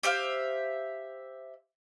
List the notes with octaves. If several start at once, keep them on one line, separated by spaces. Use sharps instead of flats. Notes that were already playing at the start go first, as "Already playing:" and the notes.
G4 C5 E5 F5